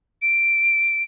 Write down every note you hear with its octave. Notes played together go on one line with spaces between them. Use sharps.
D7